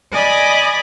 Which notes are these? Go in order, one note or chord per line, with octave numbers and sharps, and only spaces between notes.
D5 D#5 G#5 B5